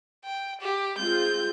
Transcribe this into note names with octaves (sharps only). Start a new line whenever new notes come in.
G5
G4
G#3 C4 F4 G6